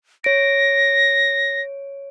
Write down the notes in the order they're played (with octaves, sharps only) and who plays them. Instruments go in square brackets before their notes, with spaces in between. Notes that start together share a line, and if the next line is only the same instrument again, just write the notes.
[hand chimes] C#5 D7 [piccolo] A#6